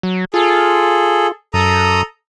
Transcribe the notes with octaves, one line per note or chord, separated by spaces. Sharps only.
F#3
F4 G#4 A4
F#2 A4 A#5 D#6